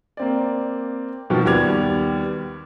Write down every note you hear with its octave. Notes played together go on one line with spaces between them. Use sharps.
A#3 C4 D5
B2 D#3 F3
D#2 G3 B3 D6 G#6 F7